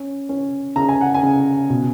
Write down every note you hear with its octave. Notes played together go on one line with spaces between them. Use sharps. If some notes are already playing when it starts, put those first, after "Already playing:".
Already playing: C#4
C#4
C#3 A#5
G#5
F#5
G#5
C#3
B2